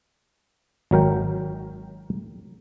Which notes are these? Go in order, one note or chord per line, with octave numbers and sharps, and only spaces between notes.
G#1 F#3 A#4 G5